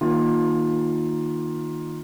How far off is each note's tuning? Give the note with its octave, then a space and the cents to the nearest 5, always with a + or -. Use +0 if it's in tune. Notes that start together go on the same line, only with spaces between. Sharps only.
D#3 +0 A#3 +0 F4 +20